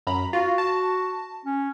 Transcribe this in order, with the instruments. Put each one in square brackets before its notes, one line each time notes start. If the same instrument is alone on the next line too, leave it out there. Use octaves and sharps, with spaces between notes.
[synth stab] F#2 A#5 B5
[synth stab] F4 [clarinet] F#4
[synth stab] A5
[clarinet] C#4